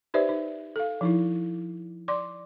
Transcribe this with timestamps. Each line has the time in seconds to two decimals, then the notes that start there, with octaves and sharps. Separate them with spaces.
0.14 D#4 G4 B4 C5 D5 E5
0.29 D#4
0.76 A4 F5
1.01 F3 D#4 E4
2.08 D5 C6 D6